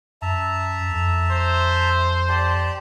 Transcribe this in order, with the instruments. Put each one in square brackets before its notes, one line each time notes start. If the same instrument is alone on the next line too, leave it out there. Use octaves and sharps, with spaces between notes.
[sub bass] F#2 [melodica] E5 A5 A#5
[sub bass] F2
[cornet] C5
[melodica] G4 D5 A5